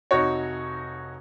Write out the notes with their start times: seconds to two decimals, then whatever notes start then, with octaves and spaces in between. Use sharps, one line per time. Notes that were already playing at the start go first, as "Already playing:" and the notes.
0.11 F1 D#4 F#4 C#5